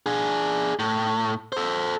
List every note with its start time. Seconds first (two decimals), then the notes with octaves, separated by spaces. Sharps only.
0.06 D4 G#4
0.79 A2
1.53 A4 C5